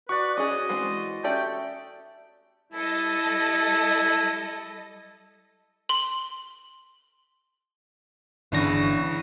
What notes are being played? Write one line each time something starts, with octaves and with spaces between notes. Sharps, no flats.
F#4 B4 D5 C#6
C#4 G#4 D#5
E3 G#3 C4
A3 C#4 G4 D5 G5
G3 E4 A4 D#5
C6 F#7
G1 E2 C#3 E3 D4 A#6